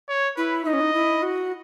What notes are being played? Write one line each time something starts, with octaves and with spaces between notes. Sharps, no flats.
C#5
E4 B4
D#4 D#5
C#4
D#4
E4
F#4